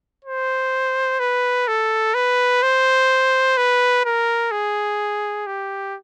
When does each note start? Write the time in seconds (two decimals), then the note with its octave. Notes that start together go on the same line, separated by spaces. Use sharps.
0.25 C5
1.20 B4
1.68 A4
2.14 B4
2.63 C5
3.57 B4
4.05 A#4
4.52 G#4
5.47 G4